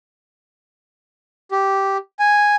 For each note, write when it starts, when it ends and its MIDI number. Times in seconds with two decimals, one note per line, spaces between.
1.51 1.97 67
2.19 2.56 80